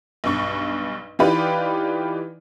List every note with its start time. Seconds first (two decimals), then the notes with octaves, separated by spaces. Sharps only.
0.24 B1 G2 C#6
1.19 E3 D#4 F4 G4 B4 D5